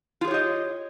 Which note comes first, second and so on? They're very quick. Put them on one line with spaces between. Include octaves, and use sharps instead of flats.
F4 G#4 C#5 G4 D#5